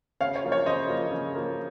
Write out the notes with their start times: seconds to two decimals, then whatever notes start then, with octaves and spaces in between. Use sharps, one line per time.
0.21 C#3 C#5 F5
0.36 C#5
0.44 F3 A#3
0.52 C#5
0.66 C#3 C5 D#5
0.88 F3 A#3
1.12 C#3
1.35 F3 A#3